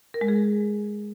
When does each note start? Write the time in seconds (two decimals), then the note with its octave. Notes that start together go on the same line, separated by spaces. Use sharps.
0.14 A#4
0.21 G#3
0.28 G#4